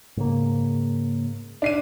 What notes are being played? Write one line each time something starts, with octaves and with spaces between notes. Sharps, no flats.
G#2 C#3 A#3
D4 C7 D#7